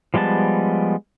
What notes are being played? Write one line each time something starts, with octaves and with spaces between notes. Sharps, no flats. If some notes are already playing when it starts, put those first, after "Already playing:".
F3 G3 G#3 B3 A5